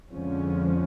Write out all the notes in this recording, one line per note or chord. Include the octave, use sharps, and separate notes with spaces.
F2 D3 F3 G#3 C#4